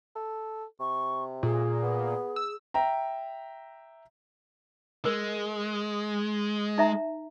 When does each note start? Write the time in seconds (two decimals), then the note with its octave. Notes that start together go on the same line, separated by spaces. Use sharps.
0.16 A4
0.80 C3 C#6
1.43 A#2 G#4
1.83 B3
2.36 E6
2.74 E5 G5 A#5
5.05 G#3 A#4
6.78 D#4 E5 A#5